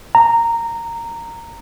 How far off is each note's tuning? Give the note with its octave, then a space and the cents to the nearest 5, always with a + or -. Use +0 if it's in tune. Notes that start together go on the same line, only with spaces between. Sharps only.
A#5 -15